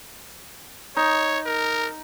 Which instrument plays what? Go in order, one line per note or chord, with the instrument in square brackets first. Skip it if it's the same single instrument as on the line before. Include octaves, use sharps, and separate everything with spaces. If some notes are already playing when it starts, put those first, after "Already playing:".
[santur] D#4 [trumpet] C#5
[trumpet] A#4